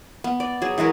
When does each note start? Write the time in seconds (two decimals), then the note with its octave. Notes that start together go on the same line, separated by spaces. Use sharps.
0.24 B3
0.40 D5
0.62 F#3 G#4
0.78 E3 G#3 F#4 A#4